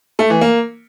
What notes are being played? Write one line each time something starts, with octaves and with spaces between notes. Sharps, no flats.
A3
E3
A#3